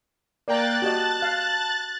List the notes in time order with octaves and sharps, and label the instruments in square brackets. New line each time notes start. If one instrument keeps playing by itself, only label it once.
[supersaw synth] A#3 G5 [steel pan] D5 A#5 [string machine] F#6 A6
[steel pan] F#4 G4 D#5 [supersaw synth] A5
[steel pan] F5